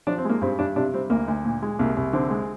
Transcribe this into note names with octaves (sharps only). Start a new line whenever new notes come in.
F3 D4
C4
G#3 A#3
G2 C4
G2 D4
C3 D4
G3 C4
D2 A#3
D2
A#2
G#3
C2 A#3
C2
D3 C4
G#3